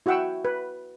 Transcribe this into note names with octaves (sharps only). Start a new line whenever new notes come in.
E4 F#4 E5 F#5 G5 E6
B4